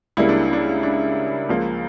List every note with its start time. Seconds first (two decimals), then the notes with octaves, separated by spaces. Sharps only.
0.17 C#2 C#3 G3 A#3 E4
0.29 D4
0.53 D4
0.83 D4
1.49 C#2 C#3 F3 A#3